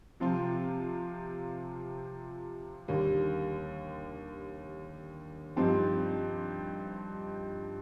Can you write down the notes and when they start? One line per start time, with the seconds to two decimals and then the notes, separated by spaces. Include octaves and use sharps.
0.20 C3 F3 C4 F4
2.88 D#2 D3 G3
5.56 G2 F3 C4 D#4 G4